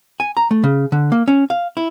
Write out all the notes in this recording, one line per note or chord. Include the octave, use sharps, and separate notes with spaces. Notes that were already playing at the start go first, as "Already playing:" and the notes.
G#5
A#5
A3
C#3
D3
A#3
C#4
F5
E4